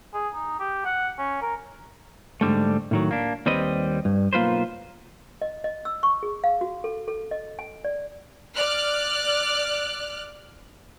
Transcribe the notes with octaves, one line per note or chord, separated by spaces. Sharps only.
G#4
D#4
G4
F#5
C#4
A#4
G#2 B2 D3 G3 A3
A2 D#3 F#3
A#3 D4
D#2 G3 C4 B4 D#5
G2
B1 A#3 F4 B4 C5
D#5
D#5
E6
C#6
G#4
F5
F#4
A4
A4
D#5
G#5
D5
D5 F6 F#6